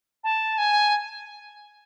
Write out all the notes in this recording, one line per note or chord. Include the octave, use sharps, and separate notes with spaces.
A5
G#5